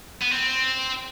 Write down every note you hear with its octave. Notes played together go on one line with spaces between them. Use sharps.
B3
C4